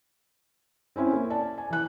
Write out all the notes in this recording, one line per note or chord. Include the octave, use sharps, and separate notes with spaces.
C4 C#4 E4
A#3
D5 A5
G#5
E3 F#6